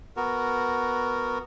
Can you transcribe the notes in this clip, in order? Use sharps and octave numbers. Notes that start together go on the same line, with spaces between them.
B3 F#4 A#4